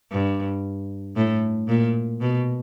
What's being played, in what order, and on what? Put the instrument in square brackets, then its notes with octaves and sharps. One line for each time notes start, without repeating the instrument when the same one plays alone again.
[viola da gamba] G2
A2
A#2
B2